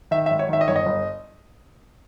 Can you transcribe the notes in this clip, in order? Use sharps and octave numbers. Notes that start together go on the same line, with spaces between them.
D#3 E5
E5
G#1
C#5
D#3 E5
D#5
G1 C#5
D#5
G1